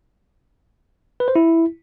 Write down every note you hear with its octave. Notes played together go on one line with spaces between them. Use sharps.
B4
C5
E4